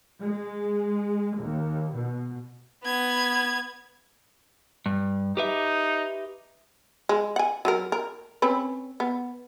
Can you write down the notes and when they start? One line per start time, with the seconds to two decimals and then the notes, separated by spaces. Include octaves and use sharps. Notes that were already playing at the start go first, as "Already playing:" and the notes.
0.20 G#3
1.38 D#2
1.94 B2
2.84 B3 G#6
4.86 G2
5.37 D#4 G4 B4 E5
7.09 G#3
7.36 F#5 G#5
7.65 F#3 F#4 A#4
7.92 A#4
8.42 C4 C#4 B4
9.00 B3